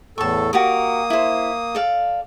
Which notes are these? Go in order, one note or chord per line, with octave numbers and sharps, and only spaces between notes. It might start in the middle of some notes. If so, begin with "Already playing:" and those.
E2 A2 A4 A5 C#6
A#3 F#4 G4 A#4 D#6
E4 C5
A4 D5 F5